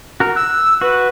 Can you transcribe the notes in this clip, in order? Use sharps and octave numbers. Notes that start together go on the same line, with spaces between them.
F#4 A#4
E6 F#6
F#4 B4